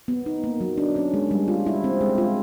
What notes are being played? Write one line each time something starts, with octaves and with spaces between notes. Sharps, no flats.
B3
D#4
A#3
F#3
D4
C#4
G#3
G3
F4
E4
C4
G#3
F4